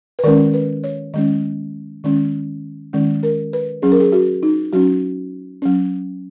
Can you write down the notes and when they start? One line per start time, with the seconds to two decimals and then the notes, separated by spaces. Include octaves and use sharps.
0.19 B4
0.24 D#3 G#3 C#4 A#4
0.54 B4
0.84 C#5
1.14 D#3 G#3 C#4 D#5
2.04 D#3 G#3 C#4
2.93 D#3 G#3 C#4
3.23 A#4
3.53 B4
3.82 F#3 C#4 G#4
3.92 A#4
4.00 G#4
4.12 F#4
4.43 D#4
4.73 F#3 C#4 F#4
5.62 F#3 C#4